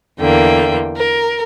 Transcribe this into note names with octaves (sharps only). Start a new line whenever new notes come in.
E2 D3 A#3 G5
A#4